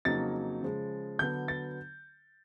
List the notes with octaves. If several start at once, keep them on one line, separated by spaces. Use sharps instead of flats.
F2 C#3 F#3 A#3 D#4 A6
C#3 F3 G#3
D3 F#3 B3 G6
A6